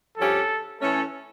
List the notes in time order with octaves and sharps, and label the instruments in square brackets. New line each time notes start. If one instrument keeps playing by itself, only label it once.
[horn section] G2 F3 C#4 G4 [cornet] A4
[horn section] E3 A3 C#4 [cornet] A4